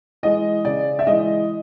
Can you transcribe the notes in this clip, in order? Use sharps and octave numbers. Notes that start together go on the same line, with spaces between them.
E3 G#3 D#5
C#3 D5
E5
E3 G#3 D#5